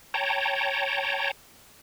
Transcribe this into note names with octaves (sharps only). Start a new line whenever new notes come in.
C#5 G5 A5 A#5